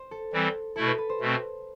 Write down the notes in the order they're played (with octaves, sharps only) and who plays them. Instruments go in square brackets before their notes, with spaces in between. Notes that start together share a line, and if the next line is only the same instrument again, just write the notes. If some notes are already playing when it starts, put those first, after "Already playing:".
Already playing: [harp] C5
A4
[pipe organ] E3 G3 C4
[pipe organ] B2 A3 E4 [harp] A4
[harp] B4
B4
C5
[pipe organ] B2 A3 C4